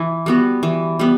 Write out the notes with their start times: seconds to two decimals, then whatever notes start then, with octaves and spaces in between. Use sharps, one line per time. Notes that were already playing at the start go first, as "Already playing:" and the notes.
Already playing: E3
0.26 G3 B3 F#4
0.63 E3
0.99 G3 B3